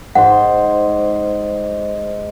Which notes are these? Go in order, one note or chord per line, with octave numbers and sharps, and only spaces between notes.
G#2 C5 F#5